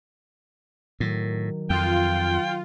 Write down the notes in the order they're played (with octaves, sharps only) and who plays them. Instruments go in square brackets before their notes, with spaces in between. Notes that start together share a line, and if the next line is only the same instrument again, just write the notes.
[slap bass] A2 [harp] D#3 F#3 D4
[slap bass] F2 [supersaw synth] F4 [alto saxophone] G5